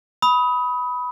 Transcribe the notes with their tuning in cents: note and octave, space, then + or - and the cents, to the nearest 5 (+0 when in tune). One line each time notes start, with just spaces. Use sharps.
B5 +0 D#6 +25